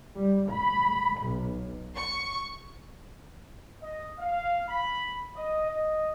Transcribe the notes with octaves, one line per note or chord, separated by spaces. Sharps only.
G3
B5
B1
C#6
D#5
F5
B5
D#5
D#5